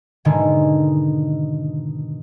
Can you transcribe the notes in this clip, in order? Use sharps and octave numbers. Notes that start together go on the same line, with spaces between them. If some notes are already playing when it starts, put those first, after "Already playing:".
G#2 B2 D3 D#3 G#3